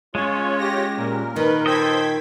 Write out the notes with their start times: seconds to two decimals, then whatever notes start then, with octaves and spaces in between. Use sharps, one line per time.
0.15 G#3 C#4 F4 C#5
0.58 G4 A#6
0.97 A#2 A#4
1.36 A#2 D#3 B4
1.66 A4 C5 D#5 G5 G#6 B6